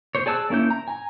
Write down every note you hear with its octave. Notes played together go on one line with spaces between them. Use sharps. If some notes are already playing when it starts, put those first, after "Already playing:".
C5 C#5
G#4 D5 A5 E6 F#6
A#3 C#4 E4 G6
A#5
G#5 A#5